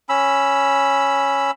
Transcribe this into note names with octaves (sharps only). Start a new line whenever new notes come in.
C#4 B5 E6